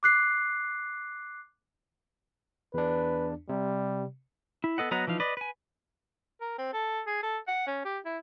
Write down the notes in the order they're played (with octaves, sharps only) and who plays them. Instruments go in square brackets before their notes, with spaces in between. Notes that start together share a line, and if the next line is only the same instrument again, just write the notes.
[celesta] D6 F#6 C7
[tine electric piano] E2 D4 [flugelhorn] B4
[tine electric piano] C3 [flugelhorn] G3
[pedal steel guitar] E4
B3 A4 D#5 F#5
F#3 B3 D#5 F#5 A#5
E3 F3 D#4 F5
B4 D5 D#5
B4 G#5
[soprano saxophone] A#4
C4
A4
G#4
A4
F#5
C#4
G4
E4